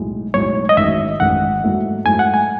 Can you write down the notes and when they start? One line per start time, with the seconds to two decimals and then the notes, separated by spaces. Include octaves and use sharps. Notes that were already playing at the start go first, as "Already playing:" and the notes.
Already playing: B1 A2 G#3
0.34 B1 A2 G#3 C#5
0.69 D#5
0.77 A1 G#2 D#3 F#3 E5
1.19 A1 G#2 D#3 F#3 F#5
1.63 G#2 F#3 A3 E4
2.05 G#2 F#3 A3 E4 G#5
2.19 F#5
2.34 G#5